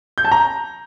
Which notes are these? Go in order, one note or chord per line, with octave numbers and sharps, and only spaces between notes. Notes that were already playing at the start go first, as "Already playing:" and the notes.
G6
A5
A#5